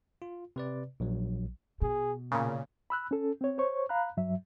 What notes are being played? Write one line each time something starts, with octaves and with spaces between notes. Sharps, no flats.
F4
C3 B4 D5
A#1 F#3
B2 G#4
A#2 C#3 A#3
B5 E6 F#6
C#4 A4
C4 C#5
C5 C#5 C#6
F5 A#5 B5 F#6
G2 F#3 E5